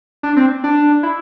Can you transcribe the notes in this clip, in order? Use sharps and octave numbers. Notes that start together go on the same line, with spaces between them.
D4
C4
D4
E4